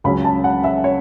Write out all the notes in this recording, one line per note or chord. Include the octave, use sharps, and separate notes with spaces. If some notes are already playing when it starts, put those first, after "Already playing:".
C#2 C#3 F#3 C#4 B5
A5
F#5
E5
C#5